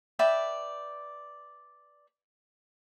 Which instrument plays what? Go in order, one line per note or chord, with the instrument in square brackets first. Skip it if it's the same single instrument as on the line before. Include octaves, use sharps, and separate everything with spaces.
[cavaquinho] B4 D5 E5 G5